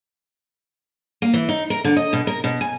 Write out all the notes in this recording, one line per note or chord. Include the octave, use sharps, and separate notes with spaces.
A#3
E3
D#4
A#4
D3
D#5
B2
A#4
B2
G#5